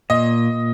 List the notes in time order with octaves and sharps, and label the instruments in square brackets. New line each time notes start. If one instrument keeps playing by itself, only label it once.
[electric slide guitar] A#2 [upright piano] D#5